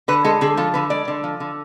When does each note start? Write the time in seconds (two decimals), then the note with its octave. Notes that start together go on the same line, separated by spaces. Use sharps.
0.08 D3 B4
0.25 G#3 A4
0.41 D3 G#4
0.57 F3 A4
0.74 D3 B4
0.90 G#3 D5
1.08 D3
1.24 F3
1.40 D3